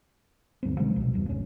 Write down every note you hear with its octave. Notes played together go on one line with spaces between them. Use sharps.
D2 G2 A#3 C4
C3 D#3 F3 G#3
C2 B2
D1 E2 G2
G#1 D#2 C#4